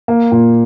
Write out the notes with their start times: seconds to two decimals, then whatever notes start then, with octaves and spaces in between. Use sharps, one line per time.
0.08 A#3
0.32 A#2